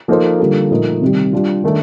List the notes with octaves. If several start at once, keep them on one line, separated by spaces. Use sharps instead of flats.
F3 A#3 D#4 A4 C5
D3 G3 A#3 F4 A4
A#2 F3 A3 D#4 A#4
C3 D#3 G3
G3 D4 F4
D#3 A3 D4 A4